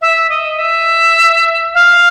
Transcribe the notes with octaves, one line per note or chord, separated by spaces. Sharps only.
E5
D#5
E5
F5